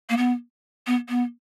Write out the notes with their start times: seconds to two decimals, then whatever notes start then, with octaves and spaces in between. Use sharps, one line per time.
0.10 A#3
0.17 B3
0.87 B3
1.09 B3